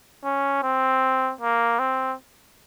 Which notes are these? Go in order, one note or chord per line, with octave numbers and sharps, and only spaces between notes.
C#4
C4
A#3
C4